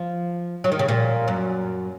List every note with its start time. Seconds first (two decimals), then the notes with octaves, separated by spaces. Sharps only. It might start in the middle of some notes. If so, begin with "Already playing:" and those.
Already playing: F3
0.64 F#3
0.72 D#3
0.79 C#3
0.88 A#2
1.28 F#2